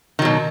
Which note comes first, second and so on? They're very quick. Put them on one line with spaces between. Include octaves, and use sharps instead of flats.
D#3 F#3 B2